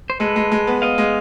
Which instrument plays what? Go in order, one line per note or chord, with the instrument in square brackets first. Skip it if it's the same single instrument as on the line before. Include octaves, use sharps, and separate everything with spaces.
[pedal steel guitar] C5
[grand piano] G#3 [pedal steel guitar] A4 B4
[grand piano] G#3
G#3
B3
[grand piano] B3 [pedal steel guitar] D#5 F5
[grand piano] G#3